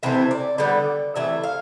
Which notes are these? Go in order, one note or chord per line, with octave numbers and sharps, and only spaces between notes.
C3 E3 A3 C4 E5
D5
D3 G3 B3 D5
C3 E3 A3 E5
F5